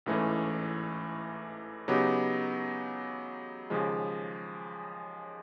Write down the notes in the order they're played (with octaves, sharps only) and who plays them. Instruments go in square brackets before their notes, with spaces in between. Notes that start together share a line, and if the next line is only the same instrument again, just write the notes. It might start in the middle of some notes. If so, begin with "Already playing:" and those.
[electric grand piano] A1 G#2 E3 A3 C#4
C#3 F#3 B3 D#4 G4
D#2 C#3 F3 G#3